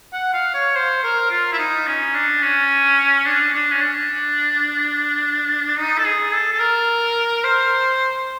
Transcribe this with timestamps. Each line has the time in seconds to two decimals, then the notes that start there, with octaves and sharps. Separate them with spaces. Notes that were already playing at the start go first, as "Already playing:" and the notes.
0.13 F#5
0.33 F5
0.54 C#5
0.75 C5
1.03 A#4
1.31 F4
1.52 E4
1.59 D#4
1.87 C#4
2.14 D4
2.43 C#4
3.26 D4
3.54 D4
3.72 C#4
3.81 D4
5.77 D#4
5.98 A4
6.05 G#4
6.33 A4
6.52 A4
6.60 A#4
7.44 C5